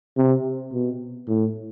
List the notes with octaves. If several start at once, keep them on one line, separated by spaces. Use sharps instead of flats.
C3
B2
A2